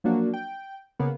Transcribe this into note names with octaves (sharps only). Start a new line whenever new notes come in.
F3 F#3 A#3 D4 F#4
G5
C#3 A#3 B3